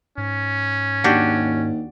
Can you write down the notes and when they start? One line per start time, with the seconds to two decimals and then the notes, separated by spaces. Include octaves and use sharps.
0.18 G#2 C#4
1.04 D#2 D4 F#4 G4